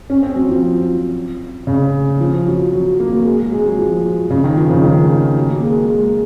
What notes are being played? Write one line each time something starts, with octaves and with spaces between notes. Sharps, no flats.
C#4
C4
F#3
F3
C#3
F3
F#3
F#3
A#3
F#3
G#3
G#3
F#3
F3
C#3
D#3
F3
C#3
D#3
F#3
A#3
G#3
G#3
G#3